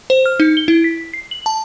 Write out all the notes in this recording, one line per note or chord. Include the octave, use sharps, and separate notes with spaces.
C5
F6
D#4
G7
E4
B6
C7
F#7
A5